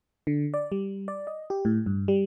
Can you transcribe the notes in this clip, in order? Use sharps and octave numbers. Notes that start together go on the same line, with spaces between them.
D3
D5
G3
D5
D#5
G4
A2
G2
G3